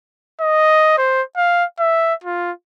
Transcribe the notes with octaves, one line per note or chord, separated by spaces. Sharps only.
D#5
C5
F5
E5
F4